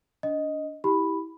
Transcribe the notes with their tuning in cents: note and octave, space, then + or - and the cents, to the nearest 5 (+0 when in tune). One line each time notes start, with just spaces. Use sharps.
D4 -30 D#5 +0
E4 -20 G4 +0 B5 +0